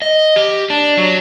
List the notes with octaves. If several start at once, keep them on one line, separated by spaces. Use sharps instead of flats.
D#5
G4
D4
F#3